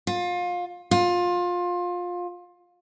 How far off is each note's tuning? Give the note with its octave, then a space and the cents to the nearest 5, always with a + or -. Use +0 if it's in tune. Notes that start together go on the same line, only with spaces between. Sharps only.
F4 +25
F4 +20